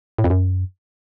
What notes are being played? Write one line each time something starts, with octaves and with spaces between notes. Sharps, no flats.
A2
F2
F#2